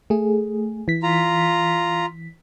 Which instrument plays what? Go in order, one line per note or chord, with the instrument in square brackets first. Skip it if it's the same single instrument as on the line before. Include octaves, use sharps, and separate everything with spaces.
[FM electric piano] A3 G#4
E3 B6
[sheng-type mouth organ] F4 A#5